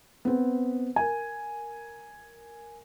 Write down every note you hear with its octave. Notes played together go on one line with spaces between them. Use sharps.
B3 C4
A#4 G#5